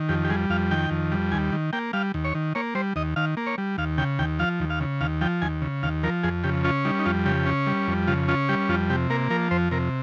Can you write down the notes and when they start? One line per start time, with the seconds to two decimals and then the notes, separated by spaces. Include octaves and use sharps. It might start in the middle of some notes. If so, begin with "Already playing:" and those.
Already playing: D#3
0.09 F2 G4
0.24 G4
0.30 G3 G#4
0.50 F2 F5
0.71 D#3 G5
0.91 F2
1.12 G3
1.32 D#2 G#5
1.52 D#3
1.73 A#3 G5
1.93 G3 F5
2.14 D#2
2.24 C#5
2.35 D#3
2.55 A#3 C#5
2.75 G3 C5
2.96 D#2 D#5
3.16 D#3 F5
3.37 A#3
3.47 C#5
3.58 G3
3.78 D#2 F5
3.98 C#3 G5
4.19 D#2 G5
4.39 F3 F5
4.60 D#2
4.70 F5
4.81 C#3
5.01 D#2 F5
5.21 F3 G5
5.42 D#2 G#5
5.62 C#3
5.83 D#2 F5
6.03 F3 A#4
6.23 F2 G#4
6.44 C#3 G4
6.64 C#4 F4
6.85 G3 D#4
6.99 D#4
7.05 F2 F4
7.25 C#3 G4
7.46 C#4
7.66 G3
7.88 F2
8.08 C#3 F4
8.28 C#4 F4
8.49 G3 G4
8.69 F2 F4
8.90 C3 G4
9.10 A#3 A#4
9.30 F3 A#4
9.51 F2 C5
9.71 C3 A#4